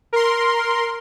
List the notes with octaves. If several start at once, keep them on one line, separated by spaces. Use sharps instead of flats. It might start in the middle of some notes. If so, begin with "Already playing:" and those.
A#4 C6